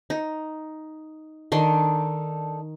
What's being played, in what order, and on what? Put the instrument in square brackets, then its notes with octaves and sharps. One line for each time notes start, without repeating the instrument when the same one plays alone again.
[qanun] D#4
[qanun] D#3 C6 [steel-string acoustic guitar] D4 D#4 A4